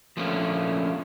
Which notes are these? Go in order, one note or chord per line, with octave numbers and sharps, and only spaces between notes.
F3 A3 A#3 C#4